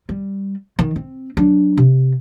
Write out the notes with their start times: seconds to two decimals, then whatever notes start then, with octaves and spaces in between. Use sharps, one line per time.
0.09 G3
0.79 D#3
0.96 C4
1.37 F#3 D4
1.77 C3